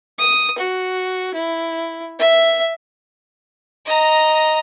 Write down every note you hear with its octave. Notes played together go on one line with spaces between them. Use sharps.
D#6
F#4
E4
E5
D#5 A#5